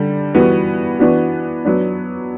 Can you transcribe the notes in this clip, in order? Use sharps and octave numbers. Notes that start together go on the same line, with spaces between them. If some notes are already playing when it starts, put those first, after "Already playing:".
Already playing: D3 G3
E3 G3 B3 F#4
E3 B3 D4 F#4
F#3 B3 D4